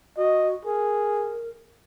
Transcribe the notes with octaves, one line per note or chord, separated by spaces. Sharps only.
F#4 D#5
G#4 A#4